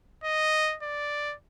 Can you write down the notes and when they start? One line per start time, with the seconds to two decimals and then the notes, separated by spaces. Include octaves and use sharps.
0.24 D#5
0.83 D5